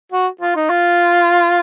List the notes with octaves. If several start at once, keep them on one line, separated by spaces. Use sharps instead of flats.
F#4
F4
D#4
F4